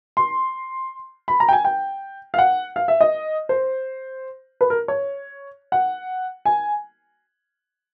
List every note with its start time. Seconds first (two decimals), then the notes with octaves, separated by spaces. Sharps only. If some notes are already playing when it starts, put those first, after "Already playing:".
0.17 C6
1.28 B5
1.40 A#5
1.49 G5
1.53 G#5
1.65 G5
2.34 F5
2.39 F#5
2.76 F5
2.88 E5
3.01 D#5
3.49 C5
4.61 B4
4.70 A#4
4.88 C#5
5.72 F#5
6.45 G#5